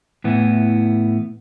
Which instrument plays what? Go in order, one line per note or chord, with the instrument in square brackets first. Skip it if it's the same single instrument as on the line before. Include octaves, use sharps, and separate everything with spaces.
[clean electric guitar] A2 E3 B3